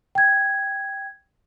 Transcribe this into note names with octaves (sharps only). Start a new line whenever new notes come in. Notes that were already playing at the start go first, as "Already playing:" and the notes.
G5 G#6